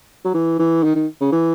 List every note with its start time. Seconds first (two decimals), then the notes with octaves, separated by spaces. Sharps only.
0.25 F#3
0.34 E3
0.59 E3
0.84 D#3
0.96 D#3
1.21 C#3
1.33 E3